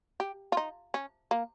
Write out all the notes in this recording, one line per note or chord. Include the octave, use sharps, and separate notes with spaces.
G4
F4
D#4
C#4
A#3